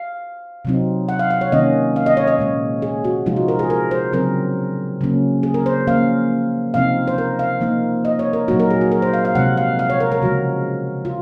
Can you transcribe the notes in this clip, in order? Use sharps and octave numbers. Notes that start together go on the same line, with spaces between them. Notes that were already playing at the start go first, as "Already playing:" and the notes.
Already playing: F5
C3 F#3 C4 D#4
F#5
F5
F5
C#5
C3 D#3 A#3 C#4 D#5
F5
D#5
C#5
D#5
A#2 G#3 C#4
G#4
F#4
C3 F3 G#3 D#4 F4
F#4
A#4
G#4
A#4
C5
C#3 F#3 C4 A#4
C#3 F#3 A#3 C#4
G#4
A#4
C5
F3 A#3 C#4 F5
C3 F3 C4 D#4 F5
C5
A#4
F5
F3 A#3 D#4
D#5
C#5
A#4
A#2 F#3 A#3 D#4 F#4
A#4
G#4
F#4
A#4
C5
F5
F5
C3 F3 G#3 F#5
F5
F5
C#5
A#4
A#4
C#3 F3 G#3 F#4
F4